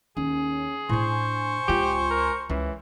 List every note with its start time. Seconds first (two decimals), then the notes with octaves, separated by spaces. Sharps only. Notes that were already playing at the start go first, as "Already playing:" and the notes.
0.17 D#2 C#4 G#4
0.89 A2 D4 C5 G#5 C#6
1.68 C#2 F4 G4
2.11 A#4
2.50 C#2 E3 C#4